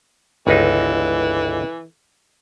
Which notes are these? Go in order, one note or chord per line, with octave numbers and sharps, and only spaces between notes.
G1 C#2 E3 D#4